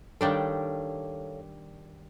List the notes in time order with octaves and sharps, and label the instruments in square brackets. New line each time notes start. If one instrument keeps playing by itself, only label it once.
[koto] D#3 G3 D4 [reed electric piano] A4 C#5 F5